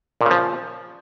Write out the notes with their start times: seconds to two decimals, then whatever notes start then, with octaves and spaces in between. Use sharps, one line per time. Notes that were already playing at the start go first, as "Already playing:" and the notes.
0.21 A#2
0.26 C#3
0.31 F3